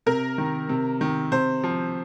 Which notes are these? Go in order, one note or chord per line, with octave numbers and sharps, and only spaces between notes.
C3 A#4
D#3
C3
D#3
C3 C5
F3